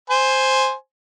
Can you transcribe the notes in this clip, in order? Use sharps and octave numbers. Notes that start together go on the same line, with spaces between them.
C5 G#5